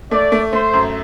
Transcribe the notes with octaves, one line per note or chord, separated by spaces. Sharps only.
A3 D5
A3
A3 C5
F#2